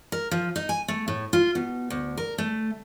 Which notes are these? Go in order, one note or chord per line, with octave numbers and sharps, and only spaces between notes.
A#4
F3
D#4
G#5
A3
A2
F4
B2
D2
A#4
A3